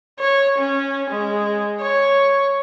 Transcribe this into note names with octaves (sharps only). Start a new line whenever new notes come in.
C#5
C#4
G#3
C#5